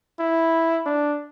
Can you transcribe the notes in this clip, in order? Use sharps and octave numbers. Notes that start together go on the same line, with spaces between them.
E4
D4